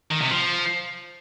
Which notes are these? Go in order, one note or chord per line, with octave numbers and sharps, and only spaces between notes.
D#3
C3
F3